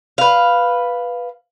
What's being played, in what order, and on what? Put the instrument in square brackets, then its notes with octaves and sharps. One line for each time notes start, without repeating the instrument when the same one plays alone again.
[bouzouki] B4 F5